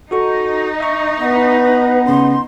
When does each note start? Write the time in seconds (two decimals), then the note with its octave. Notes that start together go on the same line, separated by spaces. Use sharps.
0.11 D#4 F#4 A4 C#6
0.80 E5 C#6
1.20 B3 B4
2.06 C#3 C#4 C6